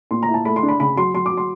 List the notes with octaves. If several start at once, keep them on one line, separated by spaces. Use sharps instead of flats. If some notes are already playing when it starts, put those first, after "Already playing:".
A#2 C6
A#5
E4
A5
A3 B5
C6
D4
B5
C#3 B5
F#3 C6
F#3 C6
D6
F#3
C6